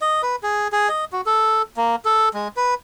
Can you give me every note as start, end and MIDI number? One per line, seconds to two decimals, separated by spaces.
0.02 0.22 75
0.23 0.36 71
0.43 0.68 68
0.72 0.89 68
0.89 1.05 75
1.13 1.21 66
1.26 1.62 69
1.77 1.96 58
2.05 2.29 69
2.34 2.48 56
2.57 2.74 71